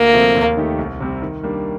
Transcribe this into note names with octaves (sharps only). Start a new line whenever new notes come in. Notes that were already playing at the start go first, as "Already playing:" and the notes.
Already playing: D2 A#3
C3 F3 A3 C4
D#2
D#3 A3 D#4 G4
C2
C3 G3 C4
D#3
G3 A#3 D4